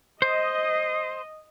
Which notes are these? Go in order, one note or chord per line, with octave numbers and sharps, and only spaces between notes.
C5 D#5